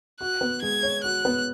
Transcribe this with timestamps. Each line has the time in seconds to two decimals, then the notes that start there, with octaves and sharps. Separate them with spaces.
0.21 F#4 F#6
0.41 B3
0.62 G#3 G#6
0.83 C#5
1.04 F#4 F#6
1.25 B3